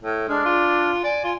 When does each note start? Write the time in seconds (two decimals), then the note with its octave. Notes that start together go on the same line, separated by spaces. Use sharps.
0.02 A2
0.29 G#3 D4 F6
0.45 F4
1.04 D5 G#5
1.24 F4